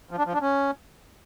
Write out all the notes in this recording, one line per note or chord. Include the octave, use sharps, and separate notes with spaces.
F3
D4
F3
D4
C#4